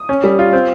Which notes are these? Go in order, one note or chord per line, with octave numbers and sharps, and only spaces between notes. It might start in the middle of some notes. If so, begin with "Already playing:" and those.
Already playing: D#6
C#4
G3
F4
C4